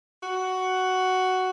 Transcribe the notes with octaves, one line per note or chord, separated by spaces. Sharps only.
F#4